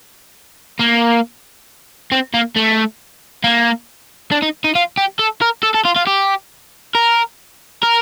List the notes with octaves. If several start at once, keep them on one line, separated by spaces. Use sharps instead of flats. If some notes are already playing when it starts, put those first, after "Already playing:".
A#3
C4
A#3
A3
A#3
D4
D#4
D#4
F4
G4
A4
A#4
A4
A4
F4
F4
G4
A#4
A#4